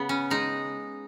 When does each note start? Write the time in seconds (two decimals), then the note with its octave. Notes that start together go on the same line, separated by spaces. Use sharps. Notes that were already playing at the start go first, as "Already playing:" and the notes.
Already playing: C#3 B3
0.09 C#4
0.30 G#3 D#4